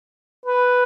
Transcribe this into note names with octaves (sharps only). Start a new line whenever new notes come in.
B4